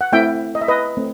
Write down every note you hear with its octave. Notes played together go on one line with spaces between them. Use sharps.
F#5
A3 C4 E4 E5 G5
D#5
E5
B4 D#5
A3 C4